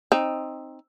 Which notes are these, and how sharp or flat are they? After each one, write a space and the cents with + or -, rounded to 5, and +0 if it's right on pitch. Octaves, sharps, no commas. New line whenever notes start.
C4 +15 D#4 +0